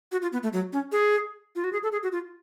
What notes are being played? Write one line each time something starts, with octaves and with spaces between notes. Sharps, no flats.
F#4
F4
B3
A3
F#3
C#4
G#4
F4
F#4
G#4
A4
G#4
F#4
F4